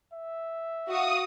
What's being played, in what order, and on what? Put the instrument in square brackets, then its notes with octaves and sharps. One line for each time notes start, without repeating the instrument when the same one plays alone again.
[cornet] E5
[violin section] F#4 F5 [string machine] D#6